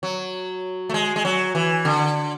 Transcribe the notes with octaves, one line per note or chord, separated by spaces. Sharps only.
F#3
A3
G#3
G#3
F#3
E3
D3